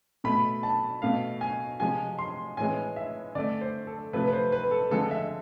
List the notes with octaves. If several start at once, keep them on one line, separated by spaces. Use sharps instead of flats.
B2 A3 B5
A5
B2 A3 F5
G#5
C3 F3 G#3 G#5
C6
A2 E3 G#3 G#5
E5
D3 A3 D5
C5
A4
C3 F3 A3 B4
B4
C5
B4
A4
D3 F3 G#3 A4
E5